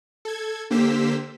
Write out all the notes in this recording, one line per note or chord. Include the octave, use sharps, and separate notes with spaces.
A4 G#6
D3 A#3 G4 C5 E6 B6